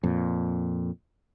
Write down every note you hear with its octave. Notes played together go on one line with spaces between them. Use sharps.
F2 A#2